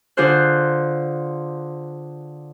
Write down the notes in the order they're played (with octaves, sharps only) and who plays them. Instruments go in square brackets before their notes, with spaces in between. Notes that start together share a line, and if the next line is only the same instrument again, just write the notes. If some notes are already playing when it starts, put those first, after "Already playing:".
[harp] D3 D4 F4 G#4 C5 F#6